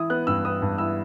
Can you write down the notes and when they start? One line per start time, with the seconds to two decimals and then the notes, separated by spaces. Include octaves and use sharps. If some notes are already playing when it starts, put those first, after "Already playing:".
Already playing: E3 E4 D#6
0.10 B3 F#6
0.27 G2 E6
0.45 B3 D#6
0.62 G2
0.78 E4 E6